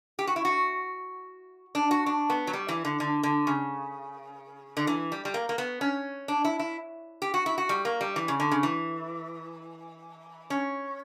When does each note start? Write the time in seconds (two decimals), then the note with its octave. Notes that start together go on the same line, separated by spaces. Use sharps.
0.19 G4
0.27 F#4
0.36 E4
0.45 F#4
1.75 D4
1.91 F#4
2.06 D4
2.30 B3
2.47 F#3
2.53 G3
2.69 E3
2.85 D3
3.00 D3
3.23 D3
3.47 C#3
4.77 D3
4.87 E3
5.12 G3
5.25 G3
5.34 A#3
5.49 A#3
5.58 B3
5.81 C#4
6.28 D4
6.45 E4
6.59 E4
7.22 G4
7.34 F#4
7.46 E4
7.58 F#4
7.69 G3
7.85 A#3
8.01 G3
8.16 E3
8.28 C#3
8.40 D3
8.51 C#3
8.63 E3
10.50 C#4